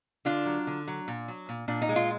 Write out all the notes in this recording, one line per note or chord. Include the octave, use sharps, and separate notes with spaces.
D3 D4 F4
F#3
D3
F#3
A#2
F#3
A#2
A#2 D4
D#4
G#3
F4